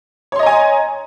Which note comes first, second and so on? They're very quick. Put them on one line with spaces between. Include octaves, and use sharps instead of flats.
C#5 C6 D#5 A#5 G#5